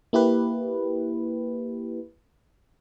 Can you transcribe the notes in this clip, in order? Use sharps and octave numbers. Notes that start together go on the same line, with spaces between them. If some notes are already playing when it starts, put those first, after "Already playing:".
A#3 E4 G4 B4